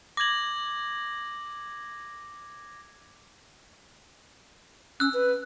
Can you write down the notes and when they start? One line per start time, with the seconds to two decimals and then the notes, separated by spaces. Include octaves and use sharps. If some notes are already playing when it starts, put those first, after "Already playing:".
0.17 D6 G#6 A#6 F#7
5.00 C#4 E6 F#6
5.14 B4